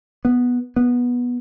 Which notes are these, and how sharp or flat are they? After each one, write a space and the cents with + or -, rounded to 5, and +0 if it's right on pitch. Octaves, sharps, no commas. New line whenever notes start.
B3 -5
B3 -15